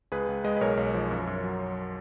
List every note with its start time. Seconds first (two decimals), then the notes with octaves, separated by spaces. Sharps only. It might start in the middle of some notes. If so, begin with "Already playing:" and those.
0.12 C#2 G#4 B4
0.29 C#2
0.44 G#3 B4 D#5
0.57 B4
0.61 B1 A#4 C#5
0.77 B1
0.94 F3
1.11 F#2
1.27 F#2
1.44 F#3